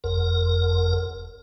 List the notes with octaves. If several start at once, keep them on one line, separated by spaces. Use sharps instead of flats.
F#1 F2 A#4